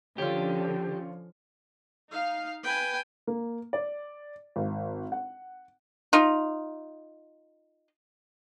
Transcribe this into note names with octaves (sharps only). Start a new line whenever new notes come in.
D3 F3 C#4 F4 G4 C#5
D#4 F5
B4 G5 G#5
A#3
D5
G#1
F#5
D#4 F4